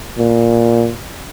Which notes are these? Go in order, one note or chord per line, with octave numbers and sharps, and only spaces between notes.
A#2